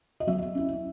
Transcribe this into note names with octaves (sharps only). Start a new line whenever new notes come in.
D#5
F#3 E5
C#4 E4